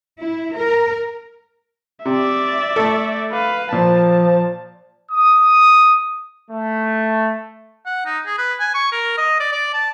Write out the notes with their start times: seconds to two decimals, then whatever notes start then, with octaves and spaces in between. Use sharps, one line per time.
0.19 E4
0.56 A#4
2.05 C3 D5 E5
2.76 A3 A4
3.32 B4 F5
3.72 A#2 F3 A5
5.12 D#6
6.50 A3
7.86 F#5
8.06 D#4
8.26 G#4
8.38 B4
8.60 G#5
8.74 C#6
8.92 A#4
9.17 D#5
9.40 D5
9.52 D5
9.73 A5